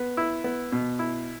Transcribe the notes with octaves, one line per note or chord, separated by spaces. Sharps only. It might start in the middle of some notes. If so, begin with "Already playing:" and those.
Already playing: B3
E4
B3
B2
E4